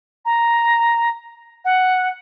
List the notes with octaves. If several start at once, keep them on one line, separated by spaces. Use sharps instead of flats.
A#5
F#5